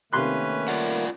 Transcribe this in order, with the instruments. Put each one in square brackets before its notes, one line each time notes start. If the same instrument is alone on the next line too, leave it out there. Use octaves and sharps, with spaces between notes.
[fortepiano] C3 C6 F#6 [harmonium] D#3 A3 A#3 [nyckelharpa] C#4 B4
[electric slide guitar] F4 D5 F#5